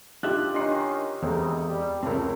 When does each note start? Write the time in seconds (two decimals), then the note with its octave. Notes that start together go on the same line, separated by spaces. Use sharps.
0.23 D4 D#4 F4 G4 E5 F#6
0.54 D#3 C#4 D4 D#5 C6 C7
1.23 E2 G2 D#3 G#3 C4 D#4 A4
1.68 G3
2.03 F1 C#2 G3 A3 C4 A#4